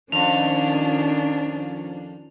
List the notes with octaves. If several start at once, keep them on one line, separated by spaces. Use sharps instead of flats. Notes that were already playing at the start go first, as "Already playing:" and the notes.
F2 D#3 C#4 D4 F7